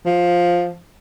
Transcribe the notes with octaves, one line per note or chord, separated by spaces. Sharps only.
F3